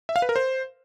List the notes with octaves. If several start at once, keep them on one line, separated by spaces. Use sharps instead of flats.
E5
F5
B4
A#4
C5